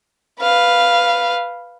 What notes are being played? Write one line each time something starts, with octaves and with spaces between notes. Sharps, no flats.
B4 F5